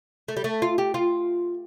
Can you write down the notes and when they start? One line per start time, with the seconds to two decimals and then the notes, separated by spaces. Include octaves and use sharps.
0.28 A3
0.37 G3
0.44 A3
0.62 F4
0.78 G4
0.94 F4